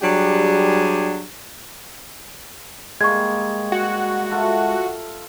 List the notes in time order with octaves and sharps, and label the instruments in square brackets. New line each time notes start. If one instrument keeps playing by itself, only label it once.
[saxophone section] F#3 G3 D4 G4 G#4
[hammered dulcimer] G3 A#3 [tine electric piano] G#3 [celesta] C#6 G#6
[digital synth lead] F#4
[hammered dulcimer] F4 A4 E5